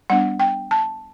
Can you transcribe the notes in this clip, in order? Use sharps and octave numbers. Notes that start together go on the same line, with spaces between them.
G3 B3 D4 F#5
G5
A5